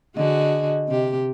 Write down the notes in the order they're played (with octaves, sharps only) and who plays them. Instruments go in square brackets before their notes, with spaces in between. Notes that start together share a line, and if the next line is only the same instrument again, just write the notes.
[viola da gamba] D3 F#4 G#4 [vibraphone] D#5
[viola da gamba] C3 G4